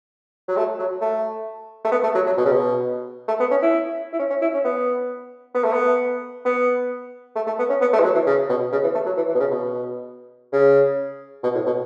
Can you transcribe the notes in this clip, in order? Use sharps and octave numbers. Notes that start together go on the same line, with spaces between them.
F#3
A3
F#3
A3
A3
B3
A3
F#3
F#3
B2
C#3
B2
A3
B3
C#4
E4
E4
C#4
C#4
E4
C#4
B3
B3
A3
B3
B3
A3
A3
B3
C#4
B3
A3
E3
F#3
E3
C#3
B2
C#3
E3
A3
F#3
E3
E3
B2
C#3
B2
C#3
B2
A2
B2